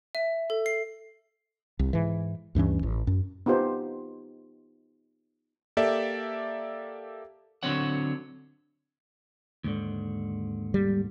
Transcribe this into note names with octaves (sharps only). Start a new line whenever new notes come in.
E5
A4
C7
C2
G#2 E3
D2 G2 E3 C#4
A1
F#2
B3 D#4 F4 G4 C5
A#3 G4 A4 D5 E5
D3 F#3 C4 C#5 F#5
D#2 G#2 D3
G3